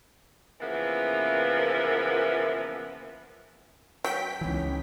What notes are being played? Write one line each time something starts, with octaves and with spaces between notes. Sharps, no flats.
C#3 E3 F3 A#3 B3 E5
F#3 G5 B6
C#2 E3 C#4 D#4